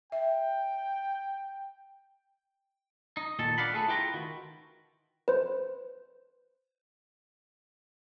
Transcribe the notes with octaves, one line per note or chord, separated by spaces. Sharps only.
E5 G5
D#4
A#2 D#3 A4
D4 D5 F5 F#5 B5
A3 G#4 A4 B4
E4 F4 B4 G5 G#5 A#5
D#3 F#4
B4 C5